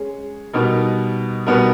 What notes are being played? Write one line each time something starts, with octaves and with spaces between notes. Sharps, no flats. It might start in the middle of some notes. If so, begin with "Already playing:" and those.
Already playing: G#3 C#4 G#4
B2 G3 B3 D#4 A#4
B2 G3 B3 D#4 A#4